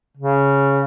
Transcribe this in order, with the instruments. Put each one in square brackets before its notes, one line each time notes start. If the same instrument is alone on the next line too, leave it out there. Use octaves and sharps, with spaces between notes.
[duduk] C#3